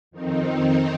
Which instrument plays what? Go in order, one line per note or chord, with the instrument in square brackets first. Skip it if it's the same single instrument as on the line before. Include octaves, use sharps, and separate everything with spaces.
[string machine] F2 D#3 C4 D#4